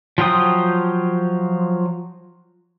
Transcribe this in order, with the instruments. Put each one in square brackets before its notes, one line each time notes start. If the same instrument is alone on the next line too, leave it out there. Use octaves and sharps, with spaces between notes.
[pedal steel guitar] F3 F#3 F4 G5 D#6